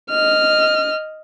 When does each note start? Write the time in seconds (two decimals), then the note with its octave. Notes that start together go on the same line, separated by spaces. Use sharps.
0.10 D#5 F6